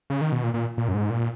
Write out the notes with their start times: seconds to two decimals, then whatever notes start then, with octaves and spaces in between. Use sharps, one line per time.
0.10 C#3
0.21 D#3
0.32 B2
0.44 A#2
0.54 A#2
0.78 A#2
0.88 F#2
0.94 G#2
1.10 A#2